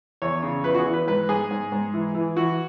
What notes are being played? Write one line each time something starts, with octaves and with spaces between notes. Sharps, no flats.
E2 C#5
C#3
E2 B4
F#4
G#4
E3
B4
G#2 B4
G#2 G#4
G#2
G#2
E3
E3
E3 F#4